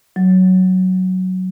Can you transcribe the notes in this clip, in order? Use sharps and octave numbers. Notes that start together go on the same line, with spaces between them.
F#3